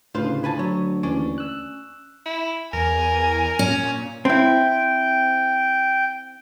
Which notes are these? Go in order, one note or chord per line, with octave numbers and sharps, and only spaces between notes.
D2 A2 C#3 F4 B4 C5
B4 G#5 A5
F#3 C#5
D#2 E3 C#4 D4 D5
E6 F#6
E4
E2 A#4 G#5
A#2 C#4
C4 E4 G5